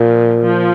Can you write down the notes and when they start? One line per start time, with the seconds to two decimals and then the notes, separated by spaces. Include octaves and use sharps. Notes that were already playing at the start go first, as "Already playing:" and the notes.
Already playing: A#2 F3
0.40 F3